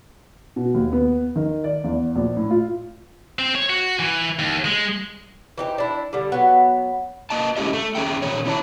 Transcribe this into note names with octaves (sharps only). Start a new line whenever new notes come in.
B2
D#2
B3
D#3
D5
E2
A#1
A2
F4
C4
C#5
F#4
E3
D#2
G#3
E3 D#4 G4 C5
D4 E4
D3 G3
F#3 B3
A#3 D#5 A5
G#3 A3 C#4 E4 G4 D#5
A3
E2 C#4 G#4 E5 G5
A#2 D#3 C#4 C#5
C#4 E4 C#5 A5